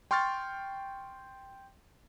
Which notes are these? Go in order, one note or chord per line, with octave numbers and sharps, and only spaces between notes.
G5 C6 C#6 F6 G6 A6